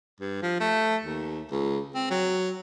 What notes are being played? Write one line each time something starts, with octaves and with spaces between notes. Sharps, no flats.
G2
F3
A3
D#2
C#2
C4
F#3